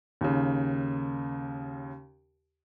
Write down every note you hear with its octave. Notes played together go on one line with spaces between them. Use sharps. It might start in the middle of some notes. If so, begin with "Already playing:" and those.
D#2 C#3